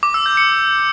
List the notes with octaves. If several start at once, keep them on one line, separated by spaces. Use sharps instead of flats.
D6
E6
G6
C#7